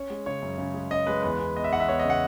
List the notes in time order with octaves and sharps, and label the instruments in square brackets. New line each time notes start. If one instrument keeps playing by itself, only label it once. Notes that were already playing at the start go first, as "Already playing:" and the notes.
Already playing: [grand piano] C#4 C#5
G#3
C#3 C#5
F#2
C#3
G#3
C#4 D#5
G#3 B4
E2 B4
E2
B3 D#5
E5
E2 F#5
E5
E2 C#5
D#5
C#3
F#5